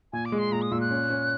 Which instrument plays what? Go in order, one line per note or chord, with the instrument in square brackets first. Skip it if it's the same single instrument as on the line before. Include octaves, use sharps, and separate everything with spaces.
[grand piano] A#2 [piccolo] G#5
[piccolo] D6
[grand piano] G#3
[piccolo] C6
[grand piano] A#2 [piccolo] A#5
[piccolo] D#6
[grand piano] A#2 [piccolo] E6
[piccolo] F#6
[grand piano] C#4
C#4